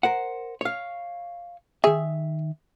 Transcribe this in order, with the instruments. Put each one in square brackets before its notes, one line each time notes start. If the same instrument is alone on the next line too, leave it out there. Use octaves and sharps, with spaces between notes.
[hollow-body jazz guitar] A#4 C5 F#5
C#5 F5
[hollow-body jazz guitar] D#3 E5 [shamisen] G#4